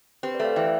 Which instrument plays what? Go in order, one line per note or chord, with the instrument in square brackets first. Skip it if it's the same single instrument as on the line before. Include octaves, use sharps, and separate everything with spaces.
[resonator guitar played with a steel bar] C4 [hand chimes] G4 B4
[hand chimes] B4 D5
[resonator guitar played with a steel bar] A3
[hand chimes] D5 F5
[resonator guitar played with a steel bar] E3 [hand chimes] E5 G5